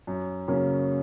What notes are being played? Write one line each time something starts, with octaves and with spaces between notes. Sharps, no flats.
F#2
C#3 F#3 A#3 C#4